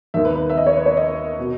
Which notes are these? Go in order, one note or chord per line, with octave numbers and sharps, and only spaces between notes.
D#2 D#3 E5
B4
B4
E5
D#5
C#5
B4
C#5
D#5
B2